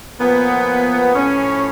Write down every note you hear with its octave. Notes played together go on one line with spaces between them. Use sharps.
A#2 F3 B3
A2 F3 C#4